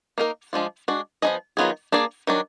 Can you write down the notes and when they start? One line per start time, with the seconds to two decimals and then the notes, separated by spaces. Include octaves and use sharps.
0.18 A#3 D#4 A#4
0.53 F3 G#3 D4 F4
0.88 G#3 D4 F#4
1.22 F3 B3 D#4 G#4 D#5
1.57 D#3 F#3 B3 F4 G#4
1.92 A#3 D4 G#4 D5
2.27 D#3 F#3 D4